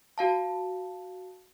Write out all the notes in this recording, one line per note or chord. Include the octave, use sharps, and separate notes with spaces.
F#4 F5 A5